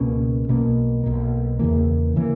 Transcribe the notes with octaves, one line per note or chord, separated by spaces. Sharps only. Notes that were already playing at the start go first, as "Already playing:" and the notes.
Already playing: C#2 B2 A#3 C#4
B1 B2 A#3
B1 B2 A#3
E2 C#3 E3 A#3
C#3 E3 A#3